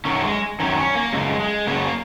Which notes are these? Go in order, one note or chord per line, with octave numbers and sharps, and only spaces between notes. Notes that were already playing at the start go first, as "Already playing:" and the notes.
F#2 D#3 C#4
G#3
F#2 D#3 C#4
C#4
A#3
F#2 C#3 G#3
G#3
F#2 C#3 A#3